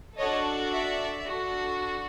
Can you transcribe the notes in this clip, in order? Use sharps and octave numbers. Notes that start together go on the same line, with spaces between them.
D4 F#4 A4 C#5 D#5
D5 E5
D4 F#4 A4